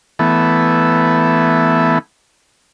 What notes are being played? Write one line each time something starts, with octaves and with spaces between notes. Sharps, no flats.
E3 A3 B3